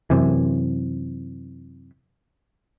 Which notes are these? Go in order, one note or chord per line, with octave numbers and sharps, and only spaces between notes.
F#2 C3 E3